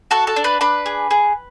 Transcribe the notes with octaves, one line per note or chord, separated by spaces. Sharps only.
F#4 A4 A5
A4 A5
D4
B4 B5
D4 B4 B5
G#4
G#4